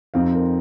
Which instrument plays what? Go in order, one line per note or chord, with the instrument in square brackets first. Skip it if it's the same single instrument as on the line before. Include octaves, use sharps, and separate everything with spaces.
[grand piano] F2 F3 C4 D#4 F5
A#4